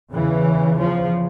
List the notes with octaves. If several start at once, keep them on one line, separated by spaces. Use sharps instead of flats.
E2 C#3 E3
F3